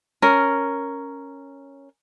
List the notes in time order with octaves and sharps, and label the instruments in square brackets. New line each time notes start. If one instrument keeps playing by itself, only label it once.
[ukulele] C#4 A#4